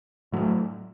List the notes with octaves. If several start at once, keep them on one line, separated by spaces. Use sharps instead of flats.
A2 F#3 A3